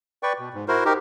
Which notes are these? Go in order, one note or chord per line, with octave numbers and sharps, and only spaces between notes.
B4 D5 G5 C#6
B2
G#2
E4 F#4 A#4 C5
D#4 G4 A#4